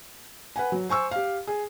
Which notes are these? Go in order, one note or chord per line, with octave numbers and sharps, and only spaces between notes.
B4 F#5 G#5
F#3
C5 G#5 C#6 E6
G4 F5
G#4